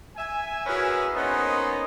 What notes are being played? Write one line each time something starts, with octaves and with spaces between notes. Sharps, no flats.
E5 G#5
C#4 E4 F#4 G#4 A#4 B4
A#3 B3 C#4 D#4 C5 D#5